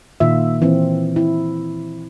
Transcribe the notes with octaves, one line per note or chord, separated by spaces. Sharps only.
A#2 D#3 F4 E5
E3 C4
E4